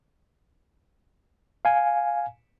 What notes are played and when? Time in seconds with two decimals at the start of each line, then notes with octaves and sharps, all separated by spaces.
1.65 F5 G#5